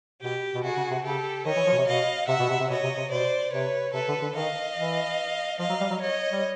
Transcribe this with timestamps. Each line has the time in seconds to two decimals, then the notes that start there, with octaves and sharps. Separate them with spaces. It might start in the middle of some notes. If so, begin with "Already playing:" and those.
0.22 B2 G4
0.55 B2
0.64 C3 F#4 G#4
0.77 C#3
0.91 C3
1.04 C#3 G4 A4
1.46 D#3 C#5 D#5
1.57 E3
1.67 F3
1.72 B2
1.78 C3
1.87 B2 D#5 F5
2.28 C3 E5 F#5
2.40 B2
2.49 C3
2.60 C3
2.70 B2 C#5 D#5
2.84 C3
2.97 C3
3.11 B2 C5 D5
3.53 C3 B4 C#5
3.94 C3 A4 B4
4.08 D3
4.22 D3
4.35 D#3 D#5 F5
4.77 E3
5.59 F3 D#5 F5
5.69 F#3
5.81 G3
5.91 F#3
6.01 C#5 D#5
6.32 G3